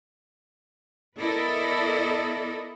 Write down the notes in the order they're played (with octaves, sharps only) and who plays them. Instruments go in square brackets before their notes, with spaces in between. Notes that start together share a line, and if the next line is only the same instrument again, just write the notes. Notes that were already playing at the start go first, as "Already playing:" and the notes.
[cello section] B3 E4 A4 A#4 D5 D#5